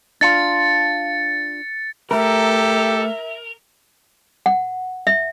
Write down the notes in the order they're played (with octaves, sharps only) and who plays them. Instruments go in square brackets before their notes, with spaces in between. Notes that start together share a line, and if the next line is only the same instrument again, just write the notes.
[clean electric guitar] D4 F4 [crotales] A6 C#7
[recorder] A3 [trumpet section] G4 A4 [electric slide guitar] A#4 [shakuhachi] E5
[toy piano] F#5
E5